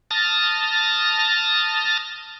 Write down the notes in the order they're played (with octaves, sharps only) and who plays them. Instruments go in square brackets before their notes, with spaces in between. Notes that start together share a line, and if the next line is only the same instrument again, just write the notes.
[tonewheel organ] A5 D#6 F6 A6 A#6